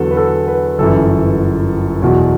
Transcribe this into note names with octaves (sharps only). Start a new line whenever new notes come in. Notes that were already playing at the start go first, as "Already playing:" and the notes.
Already playing: E2 D3 F#3 A4 B4
B4
A4
B4
G1 F#2 E3 A4
E2 B2 F#3